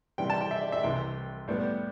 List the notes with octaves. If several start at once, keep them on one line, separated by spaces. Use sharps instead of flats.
C3 E3 G3 G5
A5
G5
E5
D5
E5
C2 C3 E3 G5
A2 G3 B3